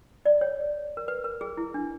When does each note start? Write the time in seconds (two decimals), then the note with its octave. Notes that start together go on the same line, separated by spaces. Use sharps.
0.26 D5
0.41 C#5
0.97 A#4
1.08 B4
1.24 A#4
1.41 G#4
1.57 E4
1.74 D4